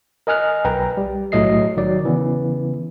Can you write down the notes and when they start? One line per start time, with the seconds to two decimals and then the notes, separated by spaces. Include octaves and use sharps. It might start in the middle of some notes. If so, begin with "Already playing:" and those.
0.27 A#4 D#5 G#5 F6 F#6
0.65 B1 B4 G5 A#5
0.97 G3
1.32 B1 A2 F#3 A3 D#5 C7
1.77 D#3 F#3 D5
2.04 C#3 E3 B3